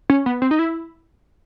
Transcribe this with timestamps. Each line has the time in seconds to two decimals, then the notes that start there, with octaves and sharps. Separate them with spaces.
0.10 C#4
0.26 B3
0.42 C4
0.51 D#4
0.59 E4